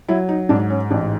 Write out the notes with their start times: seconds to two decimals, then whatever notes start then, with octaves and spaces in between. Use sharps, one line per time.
0.09 F#3 E4
0.29 D#4
0.49 G#2 D4
0.70 C#4
0.90 A1 D4